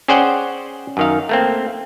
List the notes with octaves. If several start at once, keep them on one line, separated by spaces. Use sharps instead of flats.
C#4 G#4 C5 D5 F#5 G5
F#2 D#3 F5
A3 A#3 C4